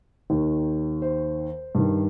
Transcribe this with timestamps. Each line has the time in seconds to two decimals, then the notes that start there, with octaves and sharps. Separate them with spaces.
0.30 D#2 D#3
1.02 C5
1.75 G2 D#3